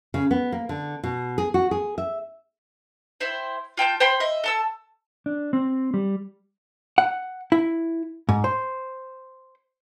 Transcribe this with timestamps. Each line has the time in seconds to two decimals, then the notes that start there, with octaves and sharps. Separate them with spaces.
0.14 C#3
0.31 B3
0.52 A#3
0.69 D3
1.03 B2
1.38 G#4
1.54 F#4
1.71 G#4
1.98 E5
3.20 E4 C5 G5
3.77 F4 G5 A5 G6
4.00 C5 G5 B5 C6
4.20 D#5 E5
4.44 A4 A5 E6
5.26 D4
5.53 C4
5.94 G3
6.98 F#5
7.52 E4
8.29 G#2
8.44 C5